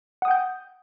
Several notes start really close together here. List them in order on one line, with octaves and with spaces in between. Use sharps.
F#5 D#6 G5 G6